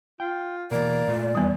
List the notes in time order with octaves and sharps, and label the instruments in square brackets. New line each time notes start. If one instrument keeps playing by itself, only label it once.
[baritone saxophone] F4 [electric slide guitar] G5
[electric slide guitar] B2 E3 [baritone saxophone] A#3 [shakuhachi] D5
[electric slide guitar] A#2 A3 F4
[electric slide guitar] E2 E3 [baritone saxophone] D#3 [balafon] G3 B3